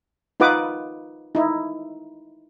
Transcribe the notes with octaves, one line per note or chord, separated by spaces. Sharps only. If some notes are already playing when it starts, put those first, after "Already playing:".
D#4 F4 B4 F#5 D6 D#6
D#4 E4